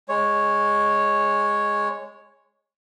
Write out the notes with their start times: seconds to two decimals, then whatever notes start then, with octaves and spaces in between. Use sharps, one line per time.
0.09 G#3 C#5